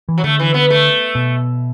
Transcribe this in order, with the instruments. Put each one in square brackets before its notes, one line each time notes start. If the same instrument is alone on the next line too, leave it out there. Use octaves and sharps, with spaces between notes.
[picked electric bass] E3
[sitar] F#3
[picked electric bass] D3 [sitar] A3
[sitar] E3
B3
A3
[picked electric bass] B2